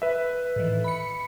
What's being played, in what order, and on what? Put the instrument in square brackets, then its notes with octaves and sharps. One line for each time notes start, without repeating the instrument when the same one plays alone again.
[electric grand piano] B4 E5
[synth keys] A2 D#3 E3
B5 C#7